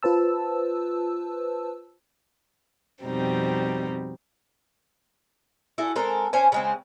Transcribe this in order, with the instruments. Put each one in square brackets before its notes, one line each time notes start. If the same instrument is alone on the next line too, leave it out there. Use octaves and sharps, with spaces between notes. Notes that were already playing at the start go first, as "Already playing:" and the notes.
[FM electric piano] F4 B4 C5 A5 E6
[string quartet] F2 B2 G3 C4 D#4
[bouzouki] E4 F#4 G#4 A4
G#3 C4 A4 A#4
C#4 C5 G#5
C#3 G#3 C4